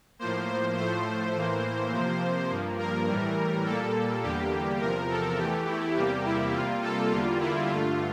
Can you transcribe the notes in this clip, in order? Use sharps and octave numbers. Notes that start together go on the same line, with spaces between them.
A2 F3 A#3 C5
C5
A2 F3 A3 C5
A2 E3 A#3
C3 F3 A#3
G2 F3 A#3
A#4
A2 E3 G3
A#2 G3 A#3 A4
E2 D3 G3 A#3 G4
E2 C3 F3 A#4
A4
E2 E3 A3 G4
E4
E2 C3 G3 A#3 G4
E4
C3 G3 A#3 F4
A4
E2 D3 G3 A#3 F4
E4
G2 D3 A3 F4